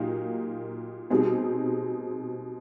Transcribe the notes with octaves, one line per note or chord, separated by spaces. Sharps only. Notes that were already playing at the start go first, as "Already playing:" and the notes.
Already playing: A#2 F#3 A#3 D#4 G4
B2 G3 C4 D#4 G#4